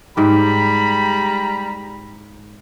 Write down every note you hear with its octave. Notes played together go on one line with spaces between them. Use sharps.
G#2 G3 G4 A#5 B5